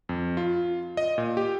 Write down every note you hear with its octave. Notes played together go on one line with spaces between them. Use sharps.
F2
F4
D#5
A#2
G4